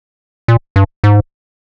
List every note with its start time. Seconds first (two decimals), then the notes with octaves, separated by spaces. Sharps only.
0.48 A#2
0.76 G2
1.04 G#2